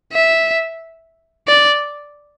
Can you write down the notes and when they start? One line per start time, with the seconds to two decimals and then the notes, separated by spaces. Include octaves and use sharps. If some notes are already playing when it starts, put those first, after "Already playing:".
0.13 E5
1.47 D5